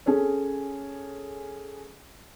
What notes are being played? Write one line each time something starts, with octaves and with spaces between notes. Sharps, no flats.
C#4 G#4 A4 C#5